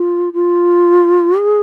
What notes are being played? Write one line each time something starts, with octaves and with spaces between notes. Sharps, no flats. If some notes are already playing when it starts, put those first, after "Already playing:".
Already playing: F4
F4
G#4